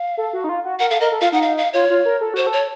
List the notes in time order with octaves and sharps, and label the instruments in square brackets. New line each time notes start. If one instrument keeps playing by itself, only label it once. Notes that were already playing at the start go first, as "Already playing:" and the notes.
Already playing: [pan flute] F5
[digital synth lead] A4
F#4
D#4
F4
F#4
[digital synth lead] A#4 [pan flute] F#5
[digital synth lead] A4 [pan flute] F5
[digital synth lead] A#4 [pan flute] D#5
[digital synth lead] A4
[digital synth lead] F4 [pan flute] F5
[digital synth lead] D#4 [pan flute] F#5
[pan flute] F5
F5
[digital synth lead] F4 [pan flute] C#5
[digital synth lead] F4
A#4
A4
[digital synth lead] F#4 [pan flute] C5
[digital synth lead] A4
[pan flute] C#5